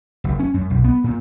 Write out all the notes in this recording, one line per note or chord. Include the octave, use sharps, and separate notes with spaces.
F#1
C#4
F#2
B1
B3
A#2